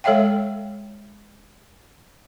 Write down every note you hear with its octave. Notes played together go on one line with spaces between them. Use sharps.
G#3 A4 C#5 E5 F5 G5